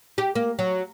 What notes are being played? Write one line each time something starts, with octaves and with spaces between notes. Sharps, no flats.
G4
A#3
F#3